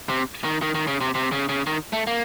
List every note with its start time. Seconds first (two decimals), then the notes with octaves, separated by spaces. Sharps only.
0.09 C3
0.44 D#3
0.62 D#3
0.75 D#3
0.88 C#3
1.01 C3
1.15 C3
1.32 C#3
1.49 C#3
1.67 D#3
1.93 A3
2.07 A#3